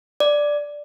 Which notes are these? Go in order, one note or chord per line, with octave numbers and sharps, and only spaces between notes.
D5